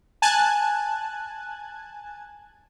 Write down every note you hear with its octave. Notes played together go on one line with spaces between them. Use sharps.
G#5 A5 F#6 G#6